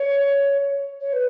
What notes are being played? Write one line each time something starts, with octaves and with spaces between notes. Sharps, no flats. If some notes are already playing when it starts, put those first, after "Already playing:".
Already playing: C#5
C#5
B4